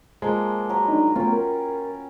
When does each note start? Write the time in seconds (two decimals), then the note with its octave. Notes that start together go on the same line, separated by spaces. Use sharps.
0.22 F3 G#3 A#3
0.69 F#3 A#4 B4
0.88 D4 D#4
1.16 A3 B3 C#4 F4 G5
1.33 A#4